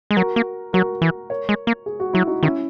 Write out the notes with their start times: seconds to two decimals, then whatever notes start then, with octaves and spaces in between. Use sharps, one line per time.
0.11 G#3
0.16 F#3 F#4 A#4
0.36 A#3
0.73 F#3 F#4 A#4
1.02 E3
1.30 A#4 C#5
1.49 G#3
1.67 A#3
1.86 G#4
2.00 F#4
2.13 F#3 E4
2.27 D#4 F#4
2.43 D#3 C#4 E4